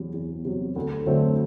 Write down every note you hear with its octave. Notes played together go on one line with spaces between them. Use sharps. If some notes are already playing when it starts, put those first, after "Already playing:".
Already playing: E2 C3 F#3
E2
C3 F#3
D2
D3 F#3 A3 C4